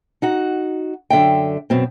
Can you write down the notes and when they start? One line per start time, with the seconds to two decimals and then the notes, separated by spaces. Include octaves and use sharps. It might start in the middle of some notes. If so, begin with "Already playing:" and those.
0.22 D#4 F#4 F#5
1.10 F#2 D3 E5 G5
1.70 F#2 B2 C4